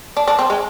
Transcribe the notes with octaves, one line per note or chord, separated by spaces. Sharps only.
D4
D4
C4
G#3